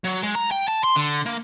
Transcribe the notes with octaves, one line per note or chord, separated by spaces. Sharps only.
F#3
G#3
A#5
G5
A5
C6
D3
A#3